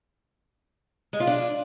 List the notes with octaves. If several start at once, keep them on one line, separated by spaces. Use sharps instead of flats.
G#3
F4
D4